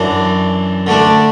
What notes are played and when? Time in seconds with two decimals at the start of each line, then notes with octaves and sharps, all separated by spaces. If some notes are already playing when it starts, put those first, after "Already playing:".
Already playing: F#2 E3 D4
0.87 D3 A3 D4